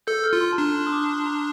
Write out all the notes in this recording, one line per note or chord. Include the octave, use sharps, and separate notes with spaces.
A4 G6
F6
F4
C6
A5
D4 A#5
C6
D#6
D6
C6
A#5